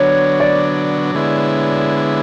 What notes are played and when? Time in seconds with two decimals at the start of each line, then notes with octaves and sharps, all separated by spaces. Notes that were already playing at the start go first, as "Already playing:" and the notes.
Already playing: D3 F#3 B3 D4 C#5
0.40 D5
1.15 D3 G#3 B3 E4